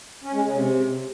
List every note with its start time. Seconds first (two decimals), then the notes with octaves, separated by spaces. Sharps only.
0.24 C#4
0.34 G#3
0.44 C#3
0.54 C3